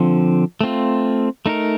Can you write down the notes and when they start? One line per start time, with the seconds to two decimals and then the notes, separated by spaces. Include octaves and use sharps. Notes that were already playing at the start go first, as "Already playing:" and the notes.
Already playing: D3 F3 C4
0.61 A3 C4 F4
1.46 A3 D#4 A#4